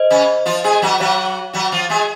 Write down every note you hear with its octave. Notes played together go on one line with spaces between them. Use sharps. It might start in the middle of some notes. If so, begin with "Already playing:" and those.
Already playing: C5 D#5
C#3 C#4
F3 F4
G#3 G#4
F#3 F#4
F#3 F#4 C#5 F5
F#3 F#4
F3 F4
G#3 G#4